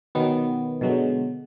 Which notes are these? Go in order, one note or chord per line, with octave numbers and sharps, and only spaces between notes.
B2 D#3 F#3 B3
B2 D3 F#3 G#3